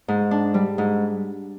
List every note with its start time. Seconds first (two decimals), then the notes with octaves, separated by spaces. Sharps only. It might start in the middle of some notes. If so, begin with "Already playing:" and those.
0.08 G#2
0.31 D4
0.54 G3
0.78 G#2